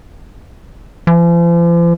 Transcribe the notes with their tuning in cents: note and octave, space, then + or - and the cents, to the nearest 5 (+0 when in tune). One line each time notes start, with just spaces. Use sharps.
F3 -45